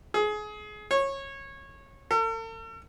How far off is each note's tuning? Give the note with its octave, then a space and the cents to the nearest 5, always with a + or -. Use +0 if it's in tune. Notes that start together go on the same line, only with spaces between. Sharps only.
G#4 +25
C#5 -20
A4 +45